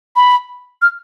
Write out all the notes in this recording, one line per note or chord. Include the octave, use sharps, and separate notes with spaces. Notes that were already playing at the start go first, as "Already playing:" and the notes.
B5
F6